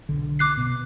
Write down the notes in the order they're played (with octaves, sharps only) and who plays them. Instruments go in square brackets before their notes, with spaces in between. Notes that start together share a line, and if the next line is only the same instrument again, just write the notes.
[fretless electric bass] B1 D3
[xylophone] D6 F#6 C7
[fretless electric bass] B2